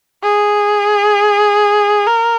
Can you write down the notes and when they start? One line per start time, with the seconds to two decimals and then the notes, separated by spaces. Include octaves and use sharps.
0.23 G#4
2.07 A#4